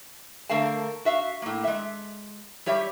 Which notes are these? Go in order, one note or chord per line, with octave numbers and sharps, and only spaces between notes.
D3 A3 A#4 F5 A5
F#4 E5 F5
A2 A#3
G#3 E5
G3 G4 C#5 E5